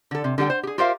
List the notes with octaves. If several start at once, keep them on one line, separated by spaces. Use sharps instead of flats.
D3 A4
C3
D3 G3 G#4 F#5 G5
C5
G4 G#4
F4 G4 A#4 C5 E5 F5